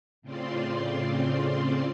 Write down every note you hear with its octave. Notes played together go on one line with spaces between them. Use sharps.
A2 C#3 C4 F4 D5 C6